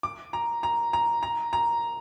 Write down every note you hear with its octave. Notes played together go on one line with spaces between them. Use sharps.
D6
A#5
A#5
A#5
A#5
A#5